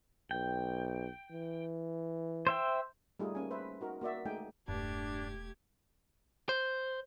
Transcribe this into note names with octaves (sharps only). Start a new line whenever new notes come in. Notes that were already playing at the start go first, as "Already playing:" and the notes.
B1 G5
E3
C5 E5 G5
G3 A3 D#4 F4 G#4
A#3 C#4 G#5
B4 C5 E5
D#4 F#4 A#4
A#3 F#4 D5 E5
G#3 A3 D#4 G5 G#5
E1 G2 A3 D4 G4 G#6
C5